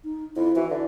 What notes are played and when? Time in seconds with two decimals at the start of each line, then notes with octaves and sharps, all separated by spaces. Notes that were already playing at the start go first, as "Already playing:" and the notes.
0.04 D#4
0.36 F2 E4
0.56 E3 F#4
0.71 D3 E4